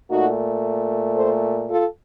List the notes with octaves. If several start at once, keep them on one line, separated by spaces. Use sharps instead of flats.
A#2 A3 D#4 F#4
A4 C5
F4 A4